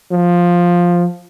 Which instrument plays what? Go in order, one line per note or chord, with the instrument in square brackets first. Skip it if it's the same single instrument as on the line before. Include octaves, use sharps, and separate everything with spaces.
[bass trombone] F3